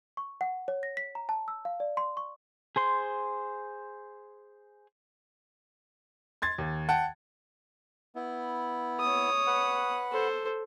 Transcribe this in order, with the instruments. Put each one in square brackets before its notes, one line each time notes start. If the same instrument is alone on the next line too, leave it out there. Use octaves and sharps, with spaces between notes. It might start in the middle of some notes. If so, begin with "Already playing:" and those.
[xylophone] C#6
F#5
C#5
A#6
B6
A#5
A5
E6
F5
D5
C6
C#6
[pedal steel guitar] G#4 C5 C6
[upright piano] C6 G#6 A6
D#2
F#5 G5 A5
[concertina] B3 E4
[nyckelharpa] C#5 D#6
[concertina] B4 F#5
[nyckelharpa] A4 C5